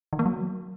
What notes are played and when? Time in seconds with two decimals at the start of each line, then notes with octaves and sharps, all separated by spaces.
0.13 D#3
0.19 A#3
0.26 F#3